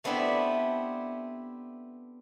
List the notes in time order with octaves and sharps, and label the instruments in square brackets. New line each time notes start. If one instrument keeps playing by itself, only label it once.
[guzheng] A3 B3 C4 D4 E4 G4